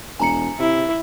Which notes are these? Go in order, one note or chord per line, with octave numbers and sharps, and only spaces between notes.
E1 G#5 A#5 C#7
C3 E4